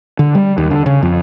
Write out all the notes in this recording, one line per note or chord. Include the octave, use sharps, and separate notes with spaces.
D3
G3
D#2
D3
C#3
F2